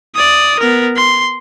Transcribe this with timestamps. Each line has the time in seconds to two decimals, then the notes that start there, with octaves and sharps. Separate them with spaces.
0.15 D5 D#6
0.59 B3 A#4
0.96 C6